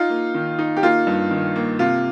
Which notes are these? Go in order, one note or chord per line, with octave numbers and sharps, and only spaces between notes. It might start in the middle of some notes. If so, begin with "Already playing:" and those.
Already playing: D#4 F4
A#3
D#3
D#4
G4
A#3 F4
G2
D#3
A#3
C3 F4